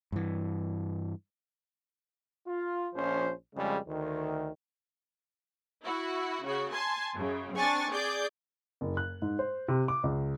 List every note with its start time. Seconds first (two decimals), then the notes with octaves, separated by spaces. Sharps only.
0.12 G2 E3
2.47 F4
2.94 A#1 F3 C#4 C5
3.56 F2 C#3 G3 G#3
3.87 D2 D#3
5.85 E4 F#4
6.44 C#3 F#4
6.73 G#5 A5 C6
7.16 F#2 C#3
7.55 C4 D4 G#5 C#6 A6
7.92 G#4 D5 D6 G6
8.81 F#1
8.97 F#6
9.22 G#2
9.39 C5
9.68 C3
9.88 D6
10.04 C#2